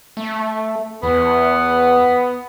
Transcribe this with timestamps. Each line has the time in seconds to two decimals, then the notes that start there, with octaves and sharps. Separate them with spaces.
0.17 A3
1.03 E2 B3